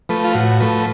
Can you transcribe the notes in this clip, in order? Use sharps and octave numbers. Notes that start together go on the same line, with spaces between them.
F3 A3 B4
F4
A2 F#4
F3 A3 B4